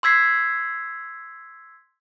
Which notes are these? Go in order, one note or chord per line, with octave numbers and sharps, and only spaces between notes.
C6 E6 G#6 B6 C7